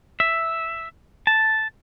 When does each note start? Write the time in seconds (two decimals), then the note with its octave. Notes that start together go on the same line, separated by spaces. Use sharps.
0.20 E5
1.27 A5